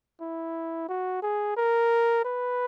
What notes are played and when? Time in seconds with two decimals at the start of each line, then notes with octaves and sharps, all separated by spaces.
0.21 E4
0.89 F#4
1.22 G#4
1.57 A#4
2.25 B4